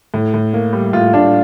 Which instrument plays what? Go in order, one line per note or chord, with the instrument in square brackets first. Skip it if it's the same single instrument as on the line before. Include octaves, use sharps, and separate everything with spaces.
[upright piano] A2
A2
A#3
G3
[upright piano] A2 [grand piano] F4
[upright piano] A2 [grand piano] D4